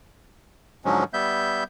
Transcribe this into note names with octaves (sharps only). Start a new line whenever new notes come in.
G#2 D3 F3 F#3 G#3 C#4
G3 B3 E5 G6